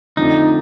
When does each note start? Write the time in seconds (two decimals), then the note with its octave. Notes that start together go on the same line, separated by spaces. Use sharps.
0.17 F2 D3 F3 A3 D4 D#4